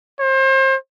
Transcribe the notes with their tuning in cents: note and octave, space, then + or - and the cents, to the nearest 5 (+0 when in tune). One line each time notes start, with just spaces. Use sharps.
C5 +35